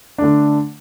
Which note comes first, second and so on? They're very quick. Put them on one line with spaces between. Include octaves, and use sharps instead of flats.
D4 A3 D3